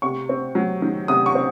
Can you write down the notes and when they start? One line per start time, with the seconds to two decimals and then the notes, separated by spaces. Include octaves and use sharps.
0.02 C3 C#6
0.29 C4
0.55 F#3
0.82 D#3
1.08 C3 D#6
1.26 C#6
1.35 C4